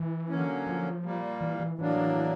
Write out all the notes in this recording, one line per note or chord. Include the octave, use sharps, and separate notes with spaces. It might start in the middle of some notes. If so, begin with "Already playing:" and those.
Already playing: E3
D3 F#3 A#3 C#4
F3
A#2 G3 A#3
E3
E3
A2 E3 F#3 A#3 D4
E3
E3